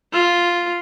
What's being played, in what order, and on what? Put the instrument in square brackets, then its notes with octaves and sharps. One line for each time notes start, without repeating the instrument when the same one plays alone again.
[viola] F4